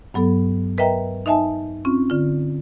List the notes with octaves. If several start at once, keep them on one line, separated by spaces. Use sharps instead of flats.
G2 F#3 B3 A4
A#4 B4 D#5 E5 G5 A#5
D#4 D#5 E5 G#5 A5
C4 C#4 F4
D3 F4